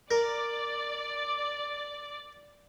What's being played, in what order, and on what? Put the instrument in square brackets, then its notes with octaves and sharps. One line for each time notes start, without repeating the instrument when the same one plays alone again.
[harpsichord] A#4 [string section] D5